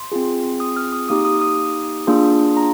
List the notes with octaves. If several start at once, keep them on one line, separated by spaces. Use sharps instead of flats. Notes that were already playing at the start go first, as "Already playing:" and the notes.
Already playing: C6
C4 F4 G#4
D#6
F6
D#6
A#3 D#4 G4 D#6
D#6
D#6
A#3 D4 F4 G#4
A#5